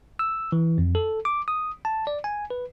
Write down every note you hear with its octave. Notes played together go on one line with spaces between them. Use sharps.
E6
E3
F2
A4
D6
D#6
A5
D5
G#5
B4